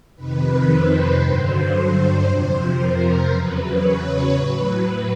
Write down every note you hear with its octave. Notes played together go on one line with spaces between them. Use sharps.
F2 C3 D#3 B4
C5
G2 D3 F#3 C5
F2 C3 F3 C5
A#4
E2 C#3 F#3 B4
C#5
A2 F#3 B4